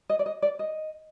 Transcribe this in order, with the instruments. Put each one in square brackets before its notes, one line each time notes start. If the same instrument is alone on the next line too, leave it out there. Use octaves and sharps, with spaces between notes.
[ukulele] D#5
D5
D#5
D5
D#5